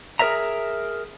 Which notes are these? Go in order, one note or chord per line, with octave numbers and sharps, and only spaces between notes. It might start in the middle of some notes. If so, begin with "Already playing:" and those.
G#4 A#4 B4 D#5 E5 A#5